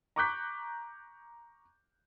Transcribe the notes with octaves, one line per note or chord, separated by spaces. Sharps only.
A#5 C#6 D6 F#6 G6 B6